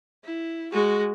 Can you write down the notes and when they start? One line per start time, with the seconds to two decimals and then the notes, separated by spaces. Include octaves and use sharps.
0.25 E4
0.72 G#3 F#4